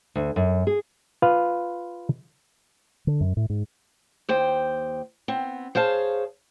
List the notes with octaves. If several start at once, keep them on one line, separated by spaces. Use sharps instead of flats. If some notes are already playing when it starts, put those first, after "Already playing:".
D2
F#2
G#4
F4 B4 F5
D3
F#2
A2
G#2
D#2 C5 G5
B3 C4
G#4 C5 C#5 F5 A5